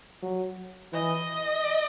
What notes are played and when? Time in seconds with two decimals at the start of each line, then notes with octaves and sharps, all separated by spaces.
0.23 F#3
0.92 E3 D#5